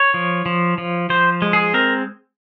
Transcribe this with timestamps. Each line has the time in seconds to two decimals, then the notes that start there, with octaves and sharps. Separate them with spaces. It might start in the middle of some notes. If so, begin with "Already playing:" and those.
Already playing: C#5
0.14 F3
0.46 F3
0.78 F3
1.10 F3 C5
1.42 G#3
1.53 G#4
1.74 C4 A#4